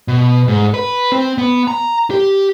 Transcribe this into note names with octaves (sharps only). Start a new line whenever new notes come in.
B2
G#2
B4
C4
B3
A#5
G4